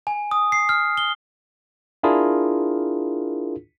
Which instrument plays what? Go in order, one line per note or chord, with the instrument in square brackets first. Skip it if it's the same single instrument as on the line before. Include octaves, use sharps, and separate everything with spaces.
[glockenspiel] G#5
D#6
C7
F6
G7
[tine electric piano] D4 E4 F4 G#4 A#4